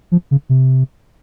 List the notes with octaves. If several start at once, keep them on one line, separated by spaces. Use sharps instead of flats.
F3
C#3
C3